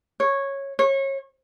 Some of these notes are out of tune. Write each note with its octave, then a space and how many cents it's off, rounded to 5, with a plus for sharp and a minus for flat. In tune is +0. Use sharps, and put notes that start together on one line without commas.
C#5 -10
C#5 -30